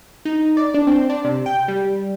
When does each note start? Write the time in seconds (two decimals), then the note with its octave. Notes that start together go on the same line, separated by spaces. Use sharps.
0.25 D#4
0.57 D5
0.74 D4
0.87 C4
1.10 D4
1.25 C3
1.46 G5
1.68 G3